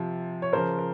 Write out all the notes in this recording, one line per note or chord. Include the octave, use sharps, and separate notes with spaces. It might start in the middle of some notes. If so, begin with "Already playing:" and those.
Already playing: C3 F3
C#5
C#3 F3 A#4 C5
A#4